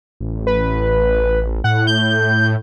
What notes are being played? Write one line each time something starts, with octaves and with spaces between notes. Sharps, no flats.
A1
B4
A2 F#5
G6